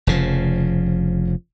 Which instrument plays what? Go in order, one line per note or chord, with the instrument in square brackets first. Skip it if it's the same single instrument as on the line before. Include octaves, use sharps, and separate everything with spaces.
[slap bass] F1 C#3 F3